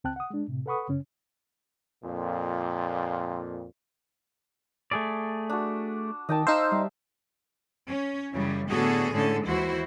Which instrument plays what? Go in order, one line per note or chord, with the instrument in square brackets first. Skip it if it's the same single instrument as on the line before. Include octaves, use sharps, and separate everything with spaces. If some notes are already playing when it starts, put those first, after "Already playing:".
[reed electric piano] C#2 C4 G5 A5 F#6
F#5 D#6
G#3 D4
A2 C3
A4 B4 F#5 B5 C#6 D#6
F#2 C#3 C#4
[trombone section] F2 A#2
[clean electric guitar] A3 G#4 D5
[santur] D4 F#4
[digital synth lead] D#3 [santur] D#5 G5 A5
[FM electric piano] D#4 C5 [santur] F5 [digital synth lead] E6
[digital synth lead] G3 [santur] E5
[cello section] C#4
F#2 C#3 E3 G3
A2 D3 B3 F#4 G#4 A4
A2 D3 G#3 C#4 A4
D#2 E3 E4 F#4 C5